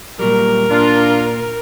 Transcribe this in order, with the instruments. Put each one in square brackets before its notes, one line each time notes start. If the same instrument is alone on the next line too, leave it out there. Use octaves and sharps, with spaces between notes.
[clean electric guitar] A#2 F#3 G3 [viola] A#4
[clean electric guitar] A#2 [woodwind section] D4 F4